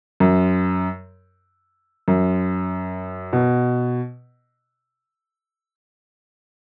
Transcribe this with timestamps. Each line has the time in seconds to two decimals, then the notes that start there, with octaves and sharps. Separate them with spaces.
0.20 F#2
2.08 F#2
3.33 B2